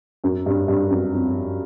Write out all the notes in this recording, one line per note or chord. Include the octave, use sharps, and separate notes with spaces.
F#2
G2
G2
F#2
F2